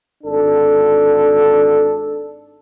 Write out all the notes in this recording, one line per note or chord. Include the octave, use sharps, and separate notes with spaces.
G#1 D4 A4